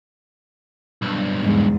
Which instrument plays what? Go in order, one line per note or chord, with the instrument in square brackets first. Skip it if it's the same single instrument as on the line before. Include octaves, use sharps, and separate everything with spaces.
[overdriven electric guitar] B1 G2
[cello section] E2 G#2